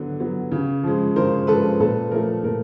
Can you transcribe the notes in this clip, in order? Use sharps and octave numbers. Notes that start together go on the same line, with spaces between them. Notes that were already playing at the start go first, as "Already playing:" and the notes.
Already playing: D3 F#3 B3
F#3 B3
C#3
F3 G#3
C#3 A#4 C5
F3 G#3 A4 B4
A#2 A4 B4
F3 A3 A#4
A#2 A#4